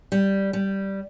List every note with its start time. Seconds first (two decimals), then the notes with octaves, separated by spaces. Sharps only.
0.12 G3
0.53 G3